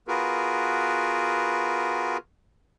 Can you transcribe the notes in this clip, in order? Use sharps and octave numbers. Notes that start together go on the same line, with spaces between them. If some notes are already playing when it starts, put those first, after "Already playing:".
B3 F4 F#4 G#4 A#4 B4